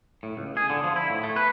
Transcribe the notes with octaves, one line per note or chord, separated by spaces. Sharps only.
A2
C#2
G#4
D3
F3
E4
A2
A3
B4